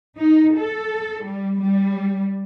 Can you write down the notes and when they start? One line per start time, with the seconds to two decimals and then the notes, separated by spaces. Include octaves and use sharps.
0.18 D#4
0.57 A4
1.24 G3
1.59 G3